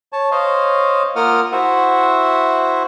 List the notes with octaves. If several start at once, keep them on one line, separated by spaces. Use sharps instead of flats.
C#5 A5
C5 C#5 D#5 F5
A#3 F4 A#4 F#5 D#6 F6
E4 F#4 C5 E5 F#5